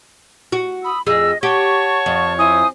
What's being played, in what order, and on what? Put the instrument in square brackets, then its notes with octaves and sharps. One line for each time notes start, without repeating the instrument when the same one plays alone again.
[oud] F#4
[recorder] B5 [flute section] D#6 E6
[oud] F2 G#4 [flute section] D#5 [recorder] E6
[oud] G4 [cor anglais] C#5 [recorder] F#5 [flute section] A5 C#6
[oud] F2
[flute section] E4 C5 G#5 [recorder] D#6